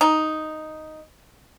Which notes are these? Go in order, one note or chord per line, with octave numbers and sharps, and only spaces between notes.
D#4